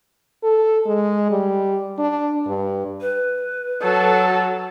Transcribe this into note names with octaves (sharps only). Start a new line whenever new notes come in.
A4
G#3
G3
D4
G2
B4
F#3 A4